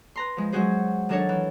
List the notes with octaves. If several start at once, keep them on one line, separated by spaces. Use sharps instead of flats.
B4 A#5 C6
F3 G#3
F#3 G#3 C#4 F#4 G#4 C5
D#3 F#3 D4 A4 A#4 C#5
E3